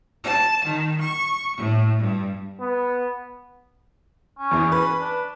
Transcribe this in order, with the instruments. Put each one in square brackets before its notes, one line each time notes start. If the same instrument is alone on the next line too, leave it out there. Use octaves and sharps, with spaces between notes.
[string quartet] A5
D#3
C#6
A2
G2
[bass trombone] B3
[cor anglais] C#4
[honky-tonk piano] E2 E3
B4
[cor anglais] D4